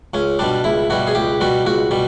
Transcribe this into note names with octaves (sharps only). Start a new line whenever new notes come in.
C#2 C#4
B2 G3 D4
C#2 E4
B2 G3 F#4
G#4
C#2 G4
B2 G3 F#4
C#2 F#4
B2 G3